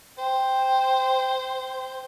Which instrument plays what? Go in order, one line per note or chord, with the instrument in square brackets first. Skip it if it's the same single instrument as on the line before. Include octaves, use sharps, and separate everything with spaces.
[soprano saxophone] C5 [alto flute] G5